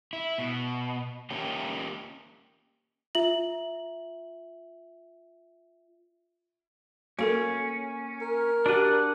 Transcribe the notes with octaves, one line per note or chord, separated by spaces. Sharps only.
E4
B2
A#3 C#4 G4
F4 E5 F#7
A#3 C#4 F#4 A4 A#4 F5
A#4
D4 F#4 G4 D5 F#5